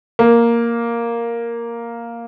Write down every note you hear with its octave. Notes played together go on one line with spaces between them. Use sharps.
A#3